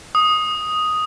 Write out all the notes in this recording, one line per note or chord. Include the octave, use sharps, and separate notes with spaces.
D#6